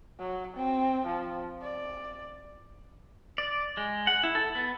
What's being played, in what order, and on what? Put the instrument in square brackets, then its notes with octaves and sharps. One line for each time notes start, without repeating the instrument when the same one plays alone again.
[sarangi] F#3
C4
F3
D5
[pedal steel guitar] D5
G#3
F#5
E4
A4
B3